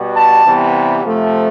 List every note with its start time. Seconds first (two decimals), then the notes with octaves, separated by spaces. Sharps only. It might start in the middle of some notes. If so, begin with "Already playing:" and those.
Already playing: B2 G3 B3
0.15 A5
0.44 C3 E3 G3 B3
1.02 C3 F3 A3